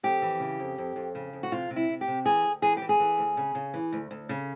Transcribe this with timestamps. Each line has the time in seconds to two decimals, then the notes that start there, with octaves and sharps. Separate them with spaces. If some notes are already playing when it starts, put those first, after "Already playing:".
0.03 F2 G4
0.22 E3
0.40 C#3
0.59 F2
0.78 F2
0.96 F2
1.15 C#3
1.33 F2
1.43 F#4
1.52 C3 F4
1.70 C3
1.76 E4
1.89 C3
2.01 G4
2.07 C3
2.25 E3 G#4
2.44 D2
2.62 E3 G#4
2.77 E3 G4
2.89 G#4
3.00 E3
3.18 D2
3.37 C#3
3.55 C#3
3.74 E3
3.93 D2
4.11 D2
4.29 C#3